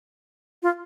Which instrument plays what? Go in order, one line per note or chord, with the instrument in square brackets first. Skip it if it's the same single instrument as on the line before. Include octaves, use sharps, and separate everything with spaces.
[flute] F4